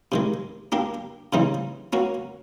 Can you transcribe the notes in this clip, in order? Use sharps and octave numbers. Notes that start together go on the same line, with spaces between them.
C3 D#3 G#3
A#3 D4 G4
C#3 E3 G3 C4 D#4
A#3 C#4 F#4